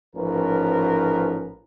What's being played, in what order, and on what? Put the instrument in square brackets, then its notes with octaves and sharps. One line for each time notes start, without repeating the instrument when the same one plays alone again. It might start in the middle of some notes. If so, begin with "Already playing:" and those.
[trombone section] A1 G#2 F3 C#4 A#4 B4